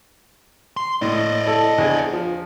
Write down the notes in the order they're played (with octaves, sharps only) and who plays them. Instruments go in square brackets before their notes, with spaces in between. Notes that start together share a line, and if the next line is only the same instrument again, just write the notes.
[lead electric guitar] C6
[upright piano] A2 [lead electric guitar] D5 D#5
[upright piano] E4 A4
E2 D4 G#4
F3